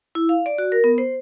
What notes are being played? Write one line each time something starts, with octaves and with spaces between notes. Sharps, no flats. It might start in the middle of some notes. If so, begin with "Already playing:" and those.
E4
F5
D5
F#4
A#4
B3
C5